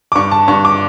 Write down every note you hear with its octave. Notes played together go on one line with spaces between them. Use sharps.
D6
G2 C#6
A5
G2 C#6
D6